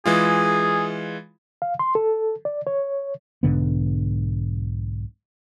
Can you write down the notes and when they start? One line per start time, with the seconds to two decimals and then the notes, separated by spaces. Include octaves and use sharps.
0.06 E3 G#3 F4 G#4
1.62 F5
1.79 C6
1.95 A4
2.45 D5
2.67 C#5
3.43 B1 G#2 D3 B3